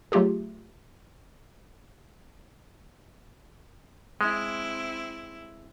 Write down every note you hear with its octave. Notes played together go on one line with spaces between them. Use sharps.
F#3 A3 F4 G4 G#4
G#3 C4 E4